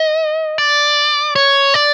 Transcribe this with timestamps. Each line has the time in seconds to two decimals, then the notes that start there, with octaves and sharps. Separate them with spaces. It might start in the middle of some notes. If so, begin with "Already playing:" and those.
Already playing: D#5
0.58 D5
1.36 C#5
1.74 D5